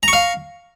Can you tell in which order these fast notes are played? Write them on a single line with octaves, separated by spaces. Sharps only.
A#5 C#6 F5